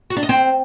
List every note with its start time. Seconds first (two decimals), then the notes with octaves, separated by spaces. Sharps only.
0.10 F#4
0.17 D4
0.23 D#5
0.29 C4